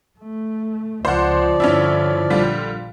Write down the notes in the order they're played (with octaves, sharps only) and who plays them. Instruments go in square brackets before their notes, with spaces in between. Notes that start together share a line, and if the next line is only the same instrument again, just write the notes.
[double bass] A3
[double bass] C#2 [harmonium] F3 D5 [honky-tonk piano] C5 F#5
[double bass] G2 D3 [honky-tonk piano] C#4 D4 E4
[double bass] A#1 [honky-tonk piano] D3 G3 F4